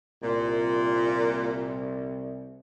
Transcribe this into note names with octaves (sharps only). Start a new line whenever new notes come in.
C2 A#2